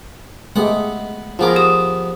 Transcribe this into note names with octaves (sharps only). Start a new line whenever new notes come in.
G#3 A3 B3 G4 F#5
F3 B3 F4 G#4 A#4 D6
G4 D#6